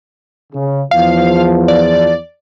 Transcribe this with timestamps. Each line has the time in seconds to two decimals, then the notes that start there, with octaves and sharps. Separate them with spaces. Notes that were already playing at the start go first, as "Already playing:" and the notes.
0.53 C#3
0.91 E2 F3 F5
1.68 D5